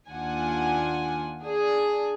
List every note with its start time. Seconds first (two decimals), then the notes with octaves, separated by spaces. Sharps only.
0.11 D#2 D4 F4 F#5 G#5
1.43 D4 G#4